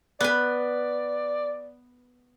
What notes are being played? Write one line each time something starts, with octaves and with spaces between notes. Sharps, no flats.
B3 B4 D5